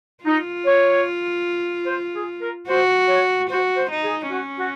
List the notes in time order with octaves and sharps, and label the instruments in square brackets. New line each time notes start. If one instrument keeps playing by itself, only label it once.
[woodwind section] D#4 [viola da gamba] F4
[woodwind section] C#5
C5
G#4
A#4
[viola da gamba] F#4 [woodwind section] C5
[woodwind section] C#5
[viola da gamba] F#4 [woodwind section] C5
[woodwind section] C5
[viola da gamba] D#4
[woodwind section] G#4
[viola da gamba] C#4 [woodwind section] F#4
[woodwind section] F#4